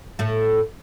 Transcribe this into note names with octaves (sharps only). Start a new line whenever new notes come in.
A2 A3